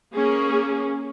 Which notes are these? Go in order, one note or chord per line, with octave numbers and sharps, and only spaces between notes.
A#3 C#4 G#4